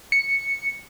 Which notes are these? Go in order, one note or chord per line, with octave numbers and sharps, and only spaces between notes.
C#7